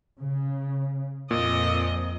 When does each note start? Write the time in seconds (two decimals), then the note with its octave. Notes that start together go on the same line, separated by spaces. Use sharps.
0.19 C#3
1.31 F2 A#2 D#5